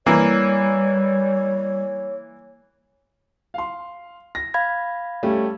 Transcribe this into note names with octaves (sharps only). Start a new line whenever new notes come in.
E3 G3 A#3 C#5
F5 C6
A#6
F5 B5 G#6
G3 A3 C#4